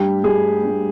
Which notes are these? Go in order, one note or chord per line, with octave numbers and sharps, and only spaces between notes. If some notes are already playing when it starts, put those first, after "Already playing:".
Already playing: G2 G3 G4
G2 G3 G#4
G2 G3